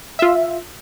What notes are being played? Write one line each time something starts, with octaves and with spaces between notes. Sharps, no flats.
F4 E5